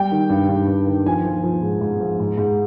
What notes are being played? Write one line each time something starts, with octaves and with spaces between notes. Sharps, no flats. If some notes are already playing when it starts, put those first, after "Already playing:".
Already playing: G3 G5
D#3
G2
G2
G2
D#3
F3 G#5
F3
F3
G#2
G#2
F3
G#2
G#2